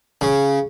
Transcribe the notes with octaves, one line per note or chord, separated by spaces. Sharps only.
C#3